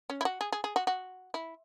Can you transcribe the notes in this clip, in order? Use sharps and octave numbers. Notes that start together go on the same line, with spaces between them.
C#4
E4
F#4
G#4
G#4
G#4
F#4
F#4
E4